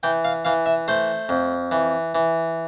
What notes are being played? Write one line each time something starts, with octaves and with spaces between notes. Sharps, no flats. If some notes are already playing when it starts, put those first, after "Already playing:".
E3 G5
F5
E3 F5
E5
A3 C5
F2
E3
E3